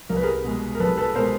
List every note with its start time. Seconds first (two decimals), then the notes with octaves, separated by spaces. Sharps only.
0.09 C2 A#4
0.16 B4
0.23 G#4 A#4
0.44 B2 G#3
0.75 A#4
0.80 C2 A4 B4
0.97 A4 B4
1.15 B2 G#3 A#4 C5